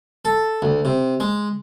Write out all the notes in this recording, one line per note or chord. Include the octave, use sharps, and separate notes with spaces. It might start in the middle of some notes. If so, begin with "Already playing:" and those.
A4
D2
C3
G#3